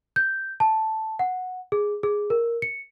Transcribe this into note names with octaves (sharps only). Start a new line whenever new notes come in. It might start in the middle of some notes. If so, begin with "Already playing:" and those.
G6
A5
F#5
G#4
G#4
A#4
C#7